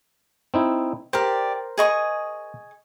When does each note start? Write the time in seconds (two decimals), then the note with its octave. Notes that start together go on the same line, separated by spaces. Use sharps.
0.54 C4 D#4 E4
1.13 G4 A#4 C5 D5
1.78 G#4 D#5 C#6